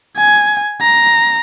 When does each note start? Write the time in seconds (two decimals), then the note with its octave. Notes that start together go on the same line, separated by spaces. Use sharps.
0.17 G#5
0.81 A#5